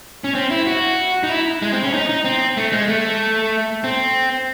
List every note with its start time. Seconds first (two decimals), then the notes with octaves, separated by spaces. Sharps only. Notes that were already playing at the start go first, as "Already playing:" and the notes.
0.24 C#4
0.35 C4
0.51 E4
0.67 F#4
1.23 D#4
1.29 E4
1.62 G#3
1.73 C4
1.83 C#4
1.94 D#4
2.09 D#4
2.25 C4
2.57 A3
2.72 G#3
2.88 A3
3.84 C4